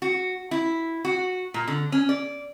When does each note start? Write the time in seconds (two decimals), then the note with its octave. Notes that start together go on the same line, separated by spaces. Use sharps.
0.02 F#4
0.51 E4
1.05 F#4
1.54 A#2
1.68 D3
1.92 C#4
2.09 D5